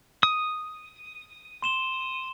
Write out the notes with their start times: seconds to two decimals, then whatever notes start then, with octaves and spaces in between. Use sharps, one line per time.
0.23 D#6
1.62 C6 E7 G7